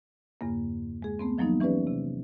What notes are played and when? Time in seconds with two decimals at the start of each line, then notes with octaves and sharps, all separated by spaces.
0.41 E2 G2 C#3 A#3
1.02 G#3 G#4
1.19 A3 B3 C4
1.38 D#3 F3 F#3 A#3 B3 D#4
1.60 E3 C#4 G4 B4 D5
1.87 C3